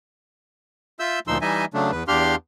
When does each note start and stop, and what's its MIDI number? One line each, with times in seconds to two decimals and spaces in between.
1.00 1.19 65
1.00 1.19 76
1.00 1.19 88
1.00 1.19 91
1.27 1.38 38
1.27 1.38 46
1.27 1.38 53
1.27 1.38 63
1.27 1.38 84
1.27 1.38 88
1.41 1.65 52
1.41 1.65 55
1.41 1.65 63
1.41 1.65 75
1.41 1.65 76
1.41 1.65 80
1.74 1.91 49
1.74 1.91 54
1.74 1.91 57
1.74 1.91 62
1.91 2.03 40
1.91 2.03 71
2.08 2.36 40
2.08 2.36 62
2.08 2.36 67
2.08 2.36 77
2.08 2.36 84
2.08 2.36 89